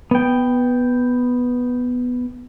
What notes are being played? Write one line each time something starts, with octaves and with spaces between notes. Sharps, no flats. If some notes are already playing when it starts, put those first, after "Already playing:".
B3 G5